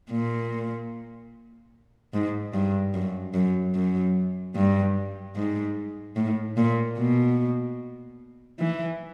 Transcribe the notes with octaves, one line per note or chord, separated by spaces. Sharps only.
A#2
G#2
G2
F#2
F#2
F#2
G2
G#2
A2
A#2
B2
E3